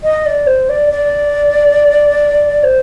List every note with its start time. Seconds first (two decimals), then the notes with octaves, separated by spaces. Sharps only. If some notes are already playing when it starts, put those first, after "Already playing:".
0.04 D#5
0.26 D5
0.47 C5
0.69 D5
0.91 D5
2.63 C5